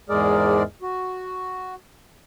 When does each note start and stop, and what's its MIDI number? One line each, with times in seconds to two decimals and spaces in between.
0.09 0.63 40
0.09 0.63 44
0.09 0.63 56
0.09 0.63 68
0.09 0.63 70
0.09 0.63 74
0.82 1.75 66